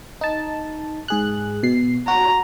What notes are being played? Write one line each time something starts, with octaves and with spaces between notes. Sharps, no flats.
D#4 A5
G#2 G#4 F#6
B2 C7
F#4 A#5